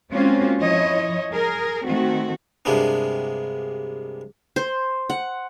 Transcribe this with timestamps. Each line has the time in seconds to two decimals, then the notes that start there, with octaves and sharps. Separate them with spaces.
0.12 G#3 A#3 C4 C#4 F4 F#4
0.59 F3 E4 C#5 D#5
1.32 G#4 A#4
1.85 D#3 A3 C4 F#4
2.65 G2 C3 G#3 A#3 B3 D4
4.56 C5
5.10 F#5